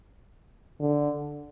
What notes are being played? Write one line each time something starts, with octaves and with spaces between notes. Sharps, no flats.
D3